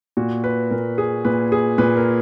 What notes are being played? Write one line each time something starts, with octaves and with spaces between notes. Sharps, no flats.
A#2 F#4
B4
A#2 A#4
G#4
A#2 B4
G#4
A#2 B4
A#4